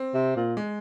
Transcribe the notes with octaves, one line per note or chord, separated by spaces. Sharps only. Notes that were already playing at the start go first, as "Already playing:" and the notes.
Already playing: C4
C3
A#2
G#3